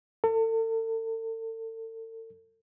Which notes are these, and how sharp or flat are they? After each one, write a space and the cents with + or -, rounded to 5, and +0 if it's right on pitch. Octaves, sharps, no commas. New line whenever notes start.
A4 +40